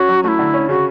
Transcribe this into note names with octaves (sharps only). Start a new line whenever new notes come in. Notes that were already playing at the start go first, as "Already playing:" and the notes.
Already playing: C#4 F#4
F#3
A3 E4 F#4
D3
C#4
C#3 F#4